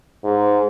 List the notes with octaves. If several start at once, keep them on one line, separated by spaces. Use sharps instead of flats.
G#2